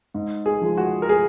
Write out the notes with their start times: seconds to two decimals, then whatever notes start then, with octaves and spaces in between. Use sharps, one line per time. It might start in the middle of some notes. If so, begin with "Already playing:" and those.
0.14 G#2
0.46 G#4
0.62 F3 G#3
0.77 F#4
1.02 A#4
1.09 G#4